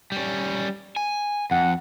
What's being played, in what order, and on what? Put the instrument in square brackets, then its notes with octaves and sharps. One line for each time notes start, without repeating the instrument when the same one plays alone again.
[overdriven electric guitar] G3 C#4
G#5
[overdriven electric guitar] F2 [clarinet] F#5